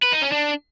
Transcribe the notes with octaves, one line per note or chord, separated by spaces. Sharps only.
B4
D#4
C#4
D4